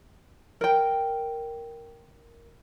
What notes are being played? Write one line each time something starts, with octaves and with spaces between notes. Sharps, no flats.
A#4 G5